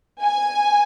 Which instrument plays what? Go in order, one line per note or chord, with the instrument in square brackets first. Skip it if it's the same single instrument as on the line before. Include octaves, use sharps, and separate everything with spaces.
[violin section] G#5